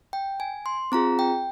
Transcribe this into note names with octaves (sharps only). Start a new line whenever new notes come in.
G5
G#5
C6
C4 F4 G#4 A#5
G5